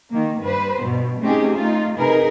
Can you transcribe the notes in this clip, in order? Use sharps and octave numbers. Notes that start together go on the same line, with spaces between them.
D#3 A#3
G2 B4 C5
G2 B2
A3 C4 C#4 D#4 G4 G#4
A3 D#4 F4
C3 D#4 G#4 A#4 B4